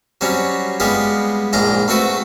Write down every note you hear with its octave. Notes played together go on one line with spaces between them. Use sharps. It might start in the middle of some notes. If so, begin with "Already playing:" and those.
F#3 G3 C4 C#4
G3 G#3 B3 F4 G4
A#1 G#2 D4 F4 A#5
A3 C4 F#4 A4 B4